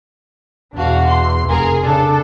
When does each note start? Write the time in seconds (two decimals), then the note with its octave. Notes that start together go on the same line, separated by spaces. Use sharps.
0.74 E2 B2 D4 F#4 F5
1.07 C6
1.49 F1 G#4 A#4
1.84 C#3 D4 A4